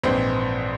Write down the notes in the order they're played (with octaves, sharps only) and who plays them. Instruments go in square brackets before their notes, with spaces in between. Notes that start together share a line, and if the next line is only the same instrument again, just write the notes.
[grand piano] A#1 G#2 E3 C4